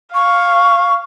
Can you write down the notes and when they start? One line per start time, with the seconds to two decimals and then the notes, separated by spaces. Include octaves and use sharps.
0.14 F5 C#6